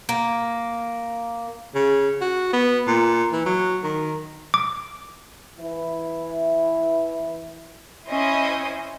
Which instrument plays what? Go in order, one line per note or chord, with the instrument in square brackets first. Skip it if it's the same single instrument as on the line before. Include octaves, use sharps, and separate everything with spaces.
[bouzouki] A#3
[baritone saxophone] C#3
F#4
B3
A#2
E3
F#3
D#3
[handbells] D6
[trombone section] E3 E4
[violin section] C#4 E4 C5 D#5